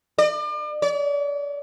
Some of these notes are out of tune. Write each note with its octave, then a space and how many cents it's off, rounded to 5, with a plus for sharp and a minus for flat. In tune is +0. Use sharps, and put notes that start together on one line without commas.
D5 +40
D5 -40